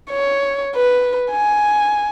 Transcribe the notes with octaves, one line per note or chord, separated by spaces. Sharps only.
C#5
B4
G#5